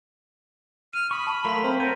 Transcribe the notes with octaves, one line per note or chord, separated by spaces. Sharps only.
F6 D#7
B5 C#6 D#6
A5
F#3 A3 A#4 F5 A#5 C6 B6
C4 B5
A#4 C#5 F#5 G6 D#7